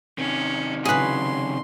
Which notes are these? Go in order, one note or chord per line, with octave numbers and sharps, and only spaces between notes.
C3 D#3 C#4
C#3 F#3 G#4 B4 C6